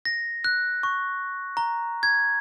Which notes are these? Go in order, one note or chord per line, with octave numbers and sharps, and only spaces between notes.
A#6
F#6
C#6
A#5
G#6